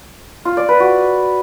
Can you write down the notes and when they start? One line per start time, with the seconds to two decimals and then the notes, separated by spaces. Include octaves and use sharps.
0.45 F4
0.57 D5
0.69 B4
0.80 F#4